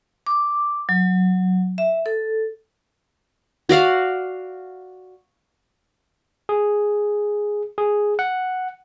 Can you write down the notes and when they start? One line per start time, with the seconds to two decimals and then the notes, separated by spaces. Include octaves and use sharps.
0.27 D6
0.89 F#3
1.78 E5
2.06 A4
3.69 F#4 D5 F5 F#5
6.49 G#4
7.78 G#4
8.19 F#5